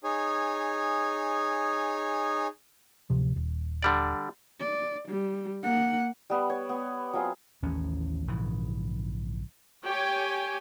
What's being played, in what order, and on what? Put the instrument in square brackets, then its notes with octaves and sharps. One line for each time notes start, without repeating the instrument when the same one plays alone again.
[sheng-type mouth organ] D#4 G#4 C#5 G#5
[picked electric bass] D1 C3 F3
D#1
[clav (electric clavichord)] D3 G3 D5
[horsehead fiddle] D5
G3
A#3 F#5
[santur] G3 B3
C#5
B3
F#3 C4 F4 G#4
[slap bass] A1 D#2 A2 C#4
A#1 G#2 C#3 E3
[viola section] G4 C#5 G5 G#5